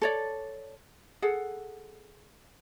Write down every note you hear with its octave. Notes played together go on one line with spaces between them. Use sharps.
A4 C#5 D5
G#4 A4 F#5